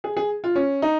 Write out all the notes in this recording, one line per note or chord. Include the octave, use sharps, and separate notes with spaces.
G#4
G#4
F4
C#4
D#4